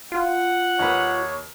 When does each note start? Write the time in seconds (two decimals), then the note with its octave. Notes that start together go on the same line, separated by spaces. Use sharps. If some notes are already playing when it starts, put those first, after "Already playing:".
0.12 F4 F#5
0.79 D#2 B4 C#5